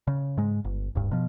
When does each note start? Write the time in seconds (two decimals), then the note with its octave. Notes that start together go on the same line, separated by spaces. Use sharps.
0.07 C#3
0.37 G#2 G#3
0.65 G1
0.95 D1 G2
1.11 B2 F3